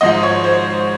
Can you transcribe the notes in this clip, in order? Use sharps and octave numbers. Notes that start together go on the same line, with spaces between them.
G#1 G#2 F3 D#5
C#5
C5